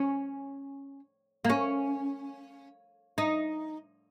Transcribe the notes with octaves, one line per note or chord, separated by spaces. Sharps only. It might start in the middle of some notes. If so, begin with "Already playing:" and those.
Already playing: C#4
A#3
C#4
D#4